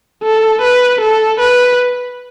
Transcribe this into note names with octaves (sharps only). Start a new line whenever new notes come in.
A4
B4
A4
B4